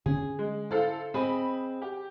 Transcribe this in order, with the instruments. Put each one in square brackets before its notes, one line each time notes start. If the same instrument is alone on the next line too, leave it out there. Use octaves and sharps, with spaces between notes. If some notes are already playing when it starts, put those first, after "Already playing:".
[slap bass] D3 C#4 [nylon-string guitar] G#4
[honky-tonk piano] G#3
[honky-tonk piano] E4 A4 F5 [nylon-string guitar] C5
[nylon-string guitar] C4 G#4 D#5 [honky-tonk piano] B5
[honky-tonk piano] G4